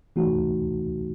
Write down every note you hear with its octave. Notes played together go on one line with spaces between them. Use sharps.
E3 A3 D#4 F#4